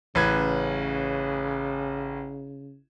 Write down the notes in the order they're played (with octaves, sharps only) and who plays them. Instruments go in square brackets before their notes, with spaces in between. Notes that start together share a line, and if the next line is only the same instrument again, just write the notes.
[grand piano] A1 B4 G#6 [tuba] C#3